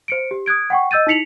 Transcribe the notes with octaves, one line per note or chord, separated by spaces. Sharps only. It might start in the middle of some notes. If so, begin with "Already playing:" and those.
C5 C#7 D7
G4
D#6 F#6 G#6 D7
F#5 G5 C#6
D#5 E6 G6 A6 D#7
D#4 E4 B6 C#7 F7 F#7